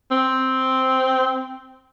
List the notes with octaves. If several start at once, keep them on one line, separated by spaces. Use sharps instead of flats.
C4